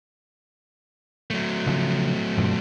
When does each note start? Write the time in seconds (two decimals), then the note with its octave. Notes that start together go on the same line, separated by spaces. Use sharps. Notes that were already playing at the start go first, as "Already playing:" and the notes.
1.30 F#3 A3
1.67 C#3 F3
2.37 G2 B2 F3